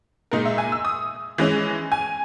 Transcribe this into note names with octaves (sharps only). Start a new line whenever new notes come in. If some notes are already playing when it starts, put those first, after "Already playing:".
A#2 G#3 D#4 A#4
E5
G#5
E6
D#6
E3 G#3 C#4
G#5